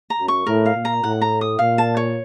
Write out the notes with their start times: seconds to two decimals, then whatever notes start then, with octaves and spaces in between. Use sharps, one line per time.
0.10 A#5
0.19 F#2
0.28 C#6
0.47 A2 A#4
0.66 F5
0.75 A#2
0.85 A#5
1.03 A2 F#5
1.21 A#5
1.41 D#6
1.59 A#2 F5
1.78 A5
1.97 C#5